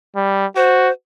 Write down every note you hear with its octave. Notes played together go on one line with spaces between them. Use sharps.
G3
F#4 C5